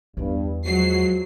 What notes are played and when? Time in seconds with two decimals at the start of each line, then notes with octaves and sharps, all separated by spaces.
0.17 E2 G2 E4
0.66 F3 F#3 G#3 F#4 C7